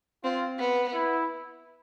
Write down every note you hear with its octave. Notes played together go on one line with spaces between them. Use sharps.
C4 F4
B3
E4